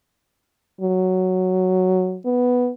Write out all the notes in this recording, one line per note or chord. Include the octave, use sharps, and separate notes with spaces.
F#3
B3